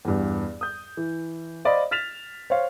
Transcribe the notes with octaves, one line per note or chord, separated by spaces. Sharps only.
E2 G2
D#6 G6
E3
C5 D5 D#5 F5 B5
F6 A6 B6 E7 F7
C5 C#5 F5